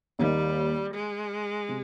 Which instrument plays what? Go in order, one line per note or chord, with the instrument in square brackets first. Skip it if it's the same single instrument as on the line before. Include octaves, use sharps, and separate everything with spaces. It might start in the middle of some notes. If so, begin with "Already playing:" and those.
[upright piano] D#2 D#3 A#3 D#4 [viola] G3
[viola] G#3
[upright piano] C3